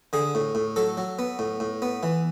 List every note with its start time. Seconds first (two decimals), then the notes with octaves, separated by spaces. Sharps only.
0.13 D3 G#4
0.35 A2
0.55 A2
0.76 F#3 A4
0.97 F#3
1.19 B3
1.39 A2
1.60 A2
1.82 B3
2.03 E3